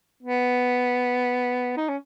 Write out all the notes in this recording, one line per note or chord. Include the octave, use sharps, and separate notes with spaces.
B3
D#4
C#4